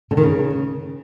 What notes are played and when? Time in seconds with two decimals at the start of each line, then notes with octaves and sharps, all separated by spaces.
0.11 D3
0.17 D#3
0.23 C#3